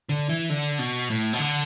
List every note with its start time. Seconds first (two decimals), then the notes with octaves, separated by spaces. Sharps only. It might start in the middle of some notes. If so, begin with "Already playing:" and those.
0.09 D3
0.29 E3
0.50 D3
0.79 B2
1.10 A2
1.33 B2
1.39 D3